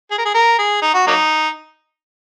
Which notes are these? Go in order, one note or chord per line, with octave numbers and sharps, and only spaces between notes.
G#4
A#4
G#4
A#4
G#4
D#4
F#4
F#3 A#3 D#4